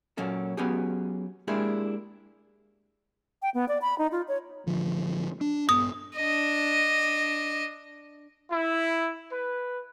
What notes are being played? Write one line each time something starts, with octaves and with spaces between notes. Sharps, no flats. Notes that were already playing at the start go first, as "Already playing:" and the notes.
A#2 F#3 A#3 C#4 A4
F#3 B3 C#4 G4 G#4
G#3 A#3 D4 E4 G4 G#4
G5
B3
D5
B5
D#4
F4
C#5
A1 D3 F3
D4
A#1 G2 B3 D#6
D4 D#5
E4
B4